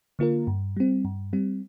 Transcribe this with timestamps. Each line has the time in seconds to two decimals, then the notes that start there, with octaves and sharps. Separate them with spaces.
0.19 D3 A#3 F4 A#4
0.47 G2
0.77 G3 C4
1.05 G2
1.33 G3 C4